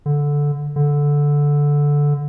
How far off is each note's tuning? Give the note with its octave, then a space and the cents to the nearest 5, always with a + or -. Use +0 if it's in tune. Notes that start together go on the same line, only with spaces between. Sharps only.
D3 -10
D3 -10